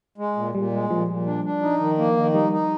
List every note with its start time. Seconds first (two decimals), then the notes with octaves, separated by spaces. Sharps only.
0.18 G#3
0.36 A#2
0.55 A#2 G3
0.72 G#3
0.90 A#2 F3
1.08 A#2
1.26 D4
1.44 D4
1.62 D#4
1.80 D#3
1.98 A#3
2.17 D#3
2.34 G3 D#4
2.52 D#4